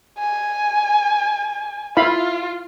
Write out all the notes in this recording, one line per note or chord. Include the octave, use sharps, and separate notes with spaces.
G#5
E4 F4 F5 B5